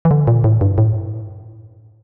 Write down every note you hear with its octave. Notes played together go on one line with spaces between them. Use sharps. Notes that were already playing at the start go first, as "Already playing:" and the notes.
E3
D3
A#2
A2
G2
A2